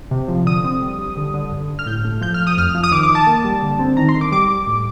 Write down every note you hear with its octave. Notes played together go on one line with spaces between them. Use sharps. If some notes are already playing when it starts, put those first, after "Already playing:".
C3
F3
D3 D#6
C4
G3
G3
D3
D3
G2
G2
F6
A2 G6
A3
F3 G6
F3 F6
D#6
F2 F6
F3
D#6
D#3 D6
D6
D#3
A5
A#3
G3
D3
C4
D#3 A#5
C6
D#3
D6
G3 D6
G3
A2